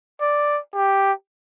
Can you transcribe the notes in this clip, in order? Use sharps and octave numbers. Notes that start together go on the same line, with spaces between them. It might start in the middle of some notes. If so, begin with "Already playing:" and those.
D5
G4